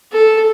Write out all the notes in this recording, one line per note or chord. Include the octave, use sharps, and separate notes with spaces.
A4